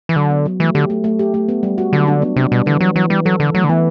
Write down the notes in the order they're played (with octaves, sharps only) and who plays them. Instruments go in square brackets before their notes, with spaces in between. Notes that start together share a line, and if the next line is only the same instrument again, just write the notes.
[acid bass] E3
[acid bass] D3 [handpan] F#3
[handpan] B3
F#3
[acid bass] E3 [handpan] A3
[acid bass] D3 [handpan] G4
[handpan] A3
A3
G4
A3
B3
G3
F#4
[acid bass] D3 [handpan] F#3
[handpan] D4
B3
[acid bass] C3 [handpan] D4
[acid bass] B2 [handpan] G3
[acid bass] D3 [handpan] E3
[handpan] E3 [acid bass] F#3
[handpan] E3 [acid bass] F#3
[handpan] E3 [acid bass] G3
[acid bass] F#3 [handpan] A4
[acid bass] D3 [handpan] A4
[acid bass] F#3 [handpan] A3
[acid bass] D3
[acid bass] E3 [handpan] B3